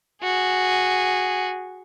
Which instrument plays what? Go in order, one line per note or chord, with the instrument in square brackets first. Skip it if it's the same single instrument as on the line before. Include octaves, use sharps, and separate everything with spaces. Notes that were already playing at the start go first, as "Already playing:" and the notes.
[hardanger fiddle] F#4 G#4